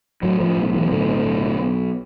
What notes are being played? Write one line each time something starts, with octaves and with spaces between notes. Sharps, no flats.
A2 F#3
F3
B1
E3
A2 D3
B1